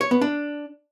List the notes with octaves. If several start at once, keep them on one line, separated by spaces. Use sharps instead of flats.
C#5
B3
D4